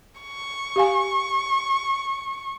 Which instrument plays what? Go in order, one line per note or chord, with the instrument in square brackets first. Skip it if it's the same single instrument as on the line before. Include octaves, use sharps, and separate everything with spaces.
[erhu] C#6
[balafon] G4 F5 G#5